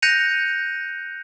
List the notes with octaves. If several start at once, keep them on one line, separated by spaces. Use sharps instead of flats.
F#6 G6 A#6 C#7 D#7 F7